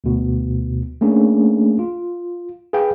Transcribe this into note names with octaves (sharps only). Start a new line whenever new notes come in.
D2 B2
A3 A#3 C#4 D4 G#4
F4
G#4 B4 F5 G5